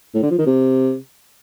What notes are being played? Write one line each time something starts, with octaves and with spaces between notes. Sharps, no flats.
A2
D3
F3
D#3
C3